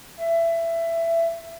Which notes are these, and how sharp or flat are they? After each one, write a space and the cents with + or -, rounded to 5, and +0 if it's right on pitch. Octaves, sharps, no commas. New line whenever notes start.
E5 +20